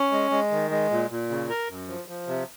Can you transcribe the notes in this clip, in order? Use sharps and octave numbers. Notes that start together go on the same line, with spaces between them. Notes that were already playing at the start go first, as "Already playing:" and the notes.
Already playing: C#4
G#3
G#3
D#3
G#3
A#2
A#2
C#3
A#4
F#2
F3
F3
C3